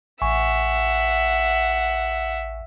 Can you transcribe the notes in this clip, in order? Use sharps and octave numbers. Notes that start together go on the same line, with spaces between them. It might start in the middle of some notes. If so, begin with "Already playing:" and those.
A1 E5 F#5 G#5 C#6